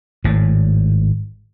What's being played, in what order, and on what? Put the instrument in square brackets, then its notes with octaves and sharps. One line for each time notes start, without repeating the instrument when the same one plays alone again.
[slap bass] G#1 A2